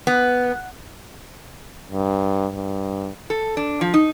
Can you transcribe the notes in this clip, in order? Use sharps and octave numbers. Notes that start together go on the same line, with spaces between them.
B3
G2
G2
A4
D4
F3
D#4